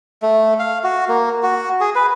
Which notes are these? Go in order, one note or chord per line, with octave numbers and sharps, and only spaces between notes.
A3
F5
F#4
A#3
F#4
G#4
B4